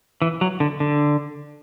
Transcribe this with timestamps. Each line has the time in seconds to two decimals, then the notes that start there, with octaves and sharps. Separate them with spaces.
0.22 E3
0.41 F#3
0.60 D3
0.80 D3